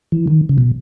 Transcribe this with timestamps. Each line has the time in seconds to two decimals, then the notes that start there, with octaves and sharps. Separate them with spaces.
0.12 E3
0.28 D#3
0.49 C#3
0.58 B2